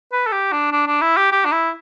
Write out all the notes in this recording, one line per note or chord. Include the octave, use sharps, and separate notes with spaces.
B4
A4
G4
D4
D4
D4
E4
G4
G4
D4
E4